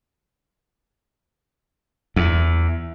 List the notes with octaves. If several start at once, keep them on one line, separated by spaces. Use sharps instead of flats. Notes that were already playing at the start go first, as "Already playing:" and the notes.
E2